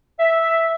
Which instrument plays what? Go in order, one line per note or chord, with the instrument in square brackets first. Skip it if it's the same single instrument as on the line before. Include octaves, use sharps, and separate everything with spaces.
[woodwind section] E5